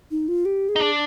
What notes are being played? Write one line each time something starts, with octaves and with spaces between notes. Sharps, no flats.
D#4
F4
G4
G#4
D#4
D4